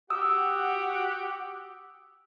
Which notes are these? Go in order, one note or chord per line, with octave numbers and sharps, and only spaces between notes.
F#4 G4 F#5 D#6 E6